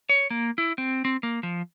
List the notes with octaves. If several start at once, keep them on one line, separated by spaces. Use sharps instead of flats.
C#5
A#3
E4
C4
C4
A#3
F3